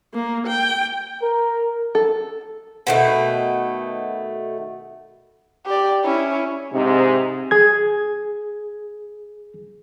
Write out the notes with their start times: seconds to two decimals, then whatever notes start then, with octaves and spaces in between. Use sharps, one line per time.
0.14 A#3
0.47 G5
1.22 A#4
1.95 A4
2.87 B2 D#3 A3
5.66 G4 D5
6.04 C#4 E4
6.73 G#2 C3
7.51 G#4 G#6